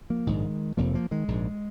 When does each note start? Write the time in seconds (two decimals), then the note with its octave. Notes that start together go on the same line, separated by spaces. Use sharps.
0.10 F3 A#3
0.27 A#1 G#2 D#3 G#3
0.77 F1 F2 C3 F3 A#3
0.94 F3 A#3
1.11 D#3 G#3
1.28 A#1 G#2